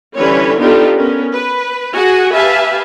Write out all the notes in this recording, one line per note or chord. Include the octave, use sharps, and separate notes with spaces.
D3 E3 G3 C#4 B4 C#5
B3 D4 D#4 F4 G4 A4
B3 C#4 A#4
B4
F#4 G#4 F#5 G#5
G4 B4 E5 F5 G#5 A5